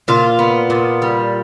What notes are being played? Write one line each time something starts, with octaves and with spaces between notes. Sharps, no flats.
A#2 F4
B3
A#2
G3